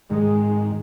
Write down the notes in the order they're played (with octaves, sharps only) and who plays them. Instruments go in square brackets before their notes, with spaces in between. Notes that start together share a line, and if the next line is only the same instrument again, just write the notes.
[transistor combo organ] G#2 D#3 [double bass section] G#3